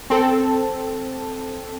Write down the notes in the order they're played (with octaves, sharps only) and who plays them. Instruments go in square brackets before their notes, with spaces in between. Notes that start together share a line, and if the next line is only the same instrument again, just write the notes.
[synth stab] C4 A4